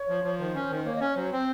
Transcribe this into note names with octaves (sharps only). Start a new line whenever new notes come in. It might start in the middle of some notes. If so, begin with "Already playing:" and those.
Already playing: C#5
F3
F3
D#3 C5
C#4
D#3
A#3 C#5
D#5
C#4 C#5
F#3 C5
C4 C5